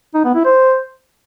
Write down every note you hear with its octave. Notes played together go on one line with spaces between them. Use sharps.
D#4
B3
E4
C5